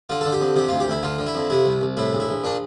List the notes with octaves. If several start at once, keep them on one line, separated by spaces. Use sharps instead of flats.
D3 F4
D3 A4
G4
F2
C3 G4
D2 F4
G4
D2 E4
D3 F4
D3
E4
F2
C3 E4
C2
C2
A2 E4
A#1
E4
A#1
A#2 D4